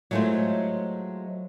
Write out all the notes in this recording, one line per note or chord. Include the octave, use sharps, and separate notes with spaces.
F#3 G#3 A3 E4 F4 C5